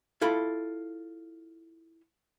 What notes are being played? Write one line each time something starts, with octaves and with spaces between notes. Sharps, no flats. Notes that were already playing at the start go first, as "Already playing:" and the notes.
E4 F4 A4 B5